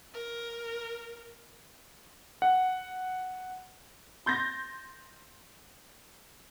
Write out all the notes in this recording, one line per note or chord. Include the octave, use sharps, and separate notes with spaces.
A#4
F#5
C6 G6 A6 A#6